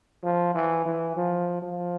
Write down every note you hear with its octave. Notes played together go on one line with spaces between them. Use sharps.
F3
E3
E3
F3
F3